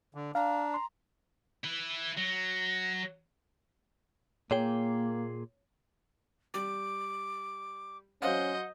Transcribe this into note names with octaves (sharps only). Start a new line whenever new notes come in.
D3
D4 F5 A#5
C6
E4 B4
F#3 A#6
A#2 A#3 G#4 C#5 G5
G3 D6
F#3 C#4 C5 D#5 F5 F#5 G6